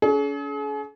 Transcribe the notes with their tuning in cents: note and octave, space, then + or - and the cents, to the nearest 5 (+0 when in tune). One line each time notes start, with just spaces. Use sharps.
C#4 +40 G#4 +40